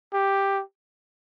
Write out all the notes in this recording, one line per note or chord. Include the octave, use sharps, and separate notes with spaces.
G4